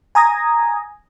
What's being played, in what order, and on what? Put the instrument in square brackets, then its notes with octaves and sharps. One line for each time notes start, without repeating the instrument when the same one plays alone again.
[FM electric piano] G#5 A#5 D#6 G#6 A#6